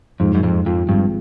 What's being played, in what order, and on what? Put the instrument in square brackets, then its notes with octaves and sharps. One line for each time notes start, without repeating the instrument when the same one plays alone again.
[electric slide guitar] F2 [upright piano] G#2
[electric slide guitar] F#2
[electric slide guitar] F2 [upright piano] G#2
[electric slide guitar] F2 [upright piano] F3
[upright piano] G#1 [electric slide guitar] G2